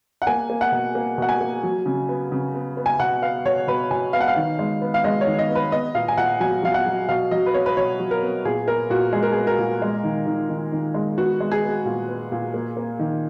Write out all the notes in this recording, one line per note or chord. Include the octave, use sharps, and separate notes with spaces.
F#5
A#3 G#5
A#3
F#5
B2
A#3
B2 F#5
G#5
A#3
F#3
C#3
B3
C#3
B3
B3
G#5
B2 F#5
B3 F5
B2 C#5
B2 B4
B2 G#5
B3 F5
F#5
F5
D#3
G#3
B3
F5
G#3 D#5
C#5
D#3
D#5
B3
B4
B3 D#5
A#2 F5
G#5
A#2 F#5
F#3 G#5
F#3 F5
F#5
F#3
B2 F5
F#3 D#5
B4
B3 C#5
B4
B2 C#5
F#3
A#4
B3
A#2 G#4
B3 A#4
A#2 F#4
G#3 G#4
A#4
B3 G#4
A#4
A#2
G#3
D#3
D#3
D#3
D#3
G#3
B3 F#4
G#3
G#4
B3
A#2
B3
A#2
A#3
A#3
D#3